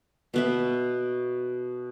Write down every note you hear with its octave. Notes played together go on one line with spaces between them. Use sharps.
B2 B3 E5